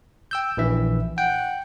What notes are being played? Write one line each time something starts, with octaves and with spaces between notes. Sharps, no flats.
G5 E6 G6
A#1 E3 E5
F#5 G5